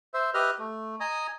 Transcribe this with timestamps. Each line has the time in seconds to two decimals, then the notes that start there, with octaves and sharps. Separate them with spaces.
0.14 C5 E5
0.34 G4 B4 D#5 E5 F6
0.59 A3
1.00 D#5 G#5 A#5 D#6